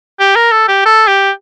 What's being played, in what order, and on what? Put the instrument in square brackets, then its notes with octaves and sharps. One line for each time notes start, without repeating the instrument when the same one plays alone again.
[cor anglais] G4
A#4
A4
G4
A4
G4